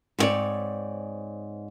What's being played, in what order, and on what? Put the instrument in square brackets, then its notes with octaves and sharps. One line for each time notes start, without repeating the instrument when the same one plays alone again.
[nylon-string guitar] G#2 B3 C4 C#5 D5